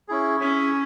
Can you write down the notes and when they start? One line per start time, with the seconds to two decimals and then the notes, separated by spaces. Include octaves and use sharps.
0.08 C#4 E4 G#4
0.40 C#4 E4 G#4 E5 G#5